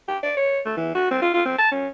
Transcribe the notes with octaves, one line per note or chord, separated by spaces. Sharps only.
G4
D5
C#5
A3
E3
F#4
C4
F4
F4
C4
A5
C#4